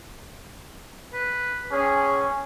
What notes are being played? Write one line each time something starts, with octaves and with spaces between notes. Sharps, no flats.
B4
C#4 G#4